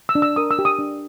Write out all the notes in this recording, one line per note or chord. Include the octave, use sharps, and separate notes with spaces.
E6
D4
E6
A#4 D#6
E6
G4
D#6
D4